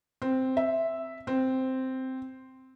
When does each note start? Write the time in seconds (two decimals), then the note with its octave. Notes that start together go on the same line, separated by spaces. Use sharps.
0.22 C4
0.57 E5
1.27 C4